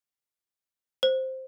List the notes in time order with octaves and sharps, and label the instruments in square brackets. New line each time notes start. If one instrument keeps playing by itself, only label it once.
[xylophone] C5